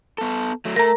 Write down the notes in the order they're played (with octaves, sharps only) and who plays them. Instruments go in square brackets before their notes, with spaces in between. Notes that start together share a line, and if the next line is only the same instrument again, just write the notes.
[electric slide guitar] B3 A4
F#3 A3
[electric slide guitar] A3 [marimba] A#4 A#5